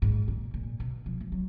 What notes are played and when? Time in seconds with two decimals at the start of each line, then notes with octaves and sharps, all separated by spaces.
0.02 G#2
0.28 A#2
0.54 A#2
0.80 B2
1.06 F3
1.20 F3
1.32 F#3